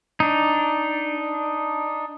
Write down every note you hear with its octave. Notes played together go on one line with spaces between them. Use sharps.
D4 D#4